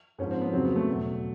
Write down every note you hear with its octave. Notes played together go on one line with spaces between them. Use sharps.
G#2 F3 C#4
C4
B3
F2 C#3 F#3 C4
B3
A3
E2 B2 F#3